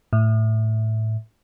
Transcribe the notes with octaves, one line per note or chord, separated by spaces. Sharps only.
A2